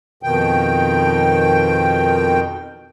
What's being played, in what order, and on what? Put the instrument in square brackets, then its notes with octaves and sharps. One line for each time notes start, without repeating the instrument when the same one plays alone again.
[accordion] F2 B2 D#3 G5